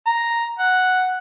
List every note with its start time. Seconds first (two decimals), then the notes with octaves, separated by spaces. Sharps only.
0.07 A#5
0.59 F#5